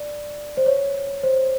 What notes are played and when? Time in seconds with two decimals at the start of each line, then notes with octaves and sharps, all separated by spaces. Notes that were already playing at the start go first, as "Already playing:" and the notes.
Already playing: D5
0.57 C5
0.66 C#5
1.23 C5